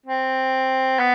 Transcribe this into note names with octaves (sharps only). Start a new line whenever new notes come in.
C4
B3